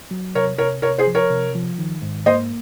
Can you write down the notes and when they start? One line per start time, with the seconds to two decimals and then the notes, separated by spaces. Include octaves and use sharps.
0.11 F#3
0.35 C3 A#4 C#5
0.58 C3 A#4 C#5
0.82 C3 A#4 C#5
0.98 G#4 C5
1.07 F3
1.15 A#4 C#5
1.30 C3
1.55 F3
1.79 D#3
2.02 G#2
2.26 A#3 C5 D#5